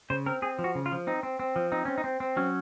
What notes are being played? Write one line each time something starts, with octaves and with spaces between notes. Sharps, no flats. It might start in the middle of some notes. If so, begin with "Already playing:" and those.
C#3 C5
C4 A#4
C4 G#4
F3
F#4
C#3
F4
F3
C4 D#4
C4
C4
F3
C4 D#4
C4 C#4
D#4
C4
C4
F#3 C#4